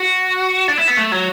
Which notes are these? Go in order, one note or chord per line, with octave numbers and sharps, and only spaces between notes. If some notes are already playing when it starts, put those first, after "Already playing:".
Already playing: F#4
D4
E4
B3
A3
F#3